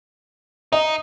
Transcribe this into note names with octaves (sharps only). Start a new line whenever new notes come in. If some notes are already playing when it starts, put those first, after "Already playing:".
D#4 D#5